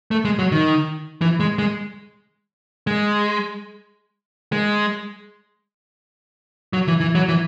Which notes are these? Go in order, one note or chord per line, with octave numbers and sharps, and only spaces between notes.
A3
G#3
F#3
D#3
E3
G#3
G#3
G#3
G#3
F#3
E3
E3
F#3
E3